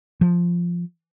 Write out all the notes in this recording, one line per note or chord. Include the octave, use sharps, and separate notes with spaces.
F3